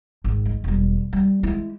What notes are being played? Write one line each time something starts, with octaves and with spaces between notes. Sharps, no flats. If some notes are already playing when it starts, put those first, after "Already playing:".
G#1
G#3
E1 G3
G3
G#3 E4